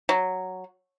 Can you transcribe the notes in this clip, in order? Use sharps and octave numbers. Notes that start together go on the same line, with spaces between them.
F#3